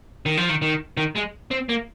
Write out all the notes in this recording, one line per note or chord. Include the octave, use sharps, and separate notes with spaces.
D#3
F3
D#3
D#3
D#3
G#3
C4
A#3